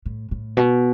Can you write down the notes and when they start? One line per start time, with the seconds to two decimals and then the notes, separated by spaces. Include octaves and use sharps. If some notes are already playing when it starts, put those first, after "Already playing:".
0.06 A2
0.31 A2
0.57 B2